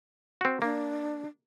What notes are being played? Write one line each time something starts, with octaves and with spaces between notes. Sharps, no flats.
C4 F#4
A#3 D4